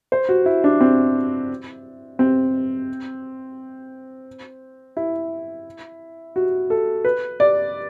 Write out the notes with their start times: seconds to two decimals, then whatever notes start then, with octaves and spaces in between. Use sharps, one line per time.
0.12 C5
0.29 F#4
0.46 E4
0.64 D4
0.81 C4
2.19 C4
4.97 E4
6.36 F#4
6.70 A4
7.05 B4
7.40 D5